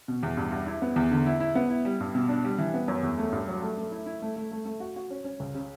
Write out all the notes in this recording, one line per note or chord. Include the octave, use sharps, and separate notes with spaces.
B2
E2
G2
G2
E4
B3
E2
D3
E4
E4
B3
E4
G3
G2
B2
D4
G3
E3
B3
F#2
E2
A3
G2
F#3
A3
A3
E4
E4
A3
A3
A3
A3
F#4
F#4
C#4
C#4
C#2
C#3